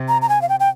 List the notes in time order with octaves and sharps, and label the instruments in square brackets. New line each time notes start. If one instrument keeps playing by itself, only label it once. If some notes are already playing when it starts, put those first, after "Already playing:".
Already playing: [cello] C3
[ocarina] A#5
A#5
G#5
F5
G5
G5